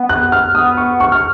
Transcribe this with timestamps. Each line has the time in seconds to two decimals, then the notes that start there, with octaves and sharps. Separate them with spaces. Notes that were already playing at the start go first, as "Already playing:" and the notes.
Already playing: B3
0.09 F#6
0.32 F6
0.54 B3 D#6
0.77 C#6
1.00 C#6
1.12 F6